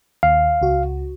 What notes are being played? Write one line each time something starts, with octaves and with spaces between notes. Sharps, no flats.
D#2 F5
C#2 F#4